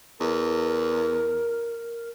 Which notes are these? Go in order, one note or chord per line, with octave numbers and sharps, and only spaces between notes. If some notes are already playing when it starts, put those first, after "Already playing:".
E2 A#4